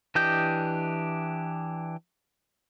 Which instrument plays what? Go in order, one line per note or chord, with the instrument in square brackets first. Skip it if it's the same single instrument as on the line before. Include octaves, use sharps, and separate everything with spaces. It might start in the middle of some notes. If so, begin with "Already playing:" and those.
[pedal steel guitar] E3 D4 G4 D#5 G6